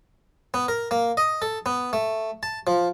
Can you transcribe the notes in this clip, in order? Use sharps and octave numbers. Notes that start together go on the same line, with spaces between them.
B3
A#4
A#3
D#5
A4
B3
A3
A5
F3